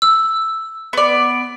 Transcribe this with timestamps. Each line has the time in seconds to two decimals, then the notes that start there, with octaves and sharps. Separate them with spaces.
0.02 E6
0.93 B3 D5